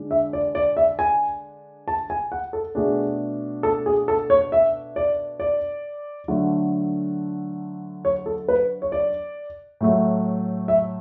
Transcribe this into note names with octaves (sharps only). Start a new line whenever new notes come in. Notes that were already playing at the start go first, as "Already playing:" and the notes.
Already playing: D3 G#3 D4
E5
D5
D5
E5
G#5
A5
G#5
F#5
A4
B2 A3 D4 G#4
A4
G#4
A4
C#5
E5
D5
D5
D3 F#3 A3
C#5
A4
B4
C#5
D5
A2 F#3 A3
E5